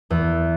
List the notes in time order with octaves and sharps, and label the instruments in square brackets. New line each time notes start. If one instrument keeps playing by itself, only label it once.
[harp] E2